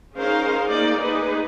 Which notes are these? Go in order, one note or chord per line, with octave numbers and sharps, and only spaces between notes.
C#4 D#4 G#4 A#4 C5 F5
A3 A#3 D#4 G#4 D5
D#4 G#4 B4